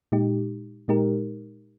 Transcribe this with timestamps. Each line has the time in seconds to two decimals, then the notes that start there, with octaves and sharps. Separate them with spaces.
0.12 A#2 G#3 D#4 G4
0.88 A#2 G#3 D#4 G4 A#4